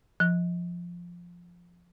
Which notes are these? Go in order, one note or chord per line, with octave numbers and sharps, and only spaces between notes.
F3